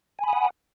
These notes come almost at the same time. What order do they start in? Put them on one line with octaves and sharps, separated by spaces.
G#5 B5 D#6 F#5